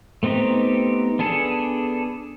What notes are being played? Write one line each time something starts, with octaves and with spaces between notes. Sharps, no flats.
A3 B3 C4 D#4 G4
B3 D4 G#4 A4